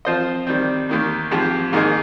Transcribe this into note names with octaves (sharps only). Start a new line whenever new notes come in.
F3 C4 F4 C5 D#5
D#3 G3 C4
D#2 D#3 A#3
G#2 F3 C4 G4
G#2 D#3 A#3 D#4 G#4